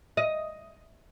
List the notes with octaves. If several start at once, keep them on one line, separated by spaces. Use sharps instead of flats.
D#5